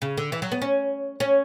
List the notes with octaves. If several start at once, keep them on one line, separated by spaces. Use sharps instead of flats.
C#3
D3
E3
F#3
B3
C#4
C#4